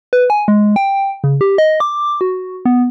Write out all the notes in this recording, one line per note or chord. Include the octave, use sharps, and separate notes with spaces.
B4
G#5
G#3
G5
C#3
G4
D#5
D6
F#4
B3